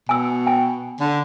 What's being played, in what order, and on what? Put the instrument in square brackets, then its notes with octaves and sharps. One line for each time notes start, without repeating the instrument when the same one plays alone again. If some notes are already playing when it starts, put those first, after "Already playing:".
[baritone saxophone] B2 [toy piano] G#5 E6
[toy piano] G5 G#5
[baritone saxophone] D3